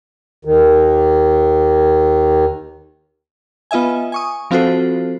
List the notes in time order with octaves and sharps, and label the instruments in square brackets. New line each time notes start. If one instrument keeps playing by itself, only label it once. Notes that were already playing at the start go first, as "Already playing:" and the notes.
[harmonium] D#2 D#3
[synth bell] B3 F4 D#5 E5 G#5
G#5 C#6 D#6
F3 C4 F4 F#4 A4 C5